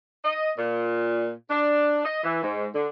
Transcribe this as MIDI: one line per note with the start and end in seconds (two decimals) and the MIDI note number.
0.24 0.50 75
0.57 1.30 46
1.50 2.01 62
2.05 2.20 75
2.23 2.41 52
2.43 2.67 44
2.74 2.88 50